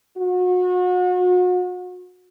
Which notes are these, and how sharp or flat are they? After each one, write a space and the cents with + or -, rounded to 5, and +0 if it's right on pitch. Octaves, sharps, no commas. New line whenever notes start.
F#4 -35